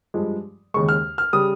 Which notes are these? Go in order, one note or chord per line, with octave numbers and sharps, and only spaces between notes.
G2 F3 G#3
D#2 C#3 G#3 C#6
F6
F6
C#3 G3 D#6